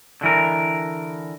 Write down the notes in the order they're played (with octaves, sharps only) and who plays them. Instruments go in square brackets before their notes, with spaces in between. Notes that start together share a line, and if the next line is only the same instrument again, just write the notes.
[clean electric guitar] D3 E3 A#4